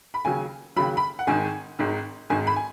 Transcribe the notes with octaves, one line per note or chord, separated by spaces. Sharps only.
B5
D#2 C#3 F#3 G#5
D#2 C#3 F#3 B5
B5
F#5
G#1 G#2 D#3 G#5
G#1 G#2 D#3
G#1 G#2 D#3 G#5
B5
G#5